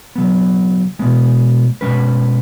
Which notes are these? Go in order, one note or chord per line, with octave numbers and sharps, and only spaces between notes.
C#3 F#3 B3
B2 G#3 B3
B2 G#3 C#4 B4